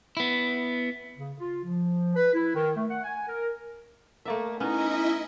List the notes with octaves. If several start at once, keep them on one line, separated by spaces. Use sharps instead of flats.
B3 E4
C#3
F4
F3
B4
E4
D#3
A3
F#5
G#5
A#4
A3 A#3 D5 E5
B3 C#4 D#4 E4 D#5 E5